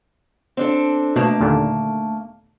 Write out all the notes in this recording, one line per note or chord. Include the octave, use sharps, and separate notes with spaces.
C4 D4 A4
B2 A3 A#3 A5
D#2 A#2 D3